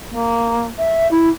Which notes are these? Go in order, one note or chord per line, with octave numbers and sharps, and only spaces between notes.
A#3
E5
E4